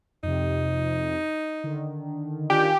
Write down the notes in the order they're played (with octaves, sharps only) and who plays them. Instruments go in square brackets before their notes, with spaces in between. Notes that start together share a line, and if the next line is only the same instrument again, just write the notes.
[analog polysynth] F2 C3 [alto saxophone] D#4
[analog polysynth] D3 D#3
[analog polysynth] D#3 F4 G#5 [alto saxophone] D4 [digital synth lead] G4